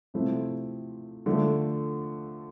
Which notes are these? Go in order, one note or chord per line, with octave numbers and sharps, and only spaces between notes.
C3 F3 A3 C4 E4
D3 F3 A3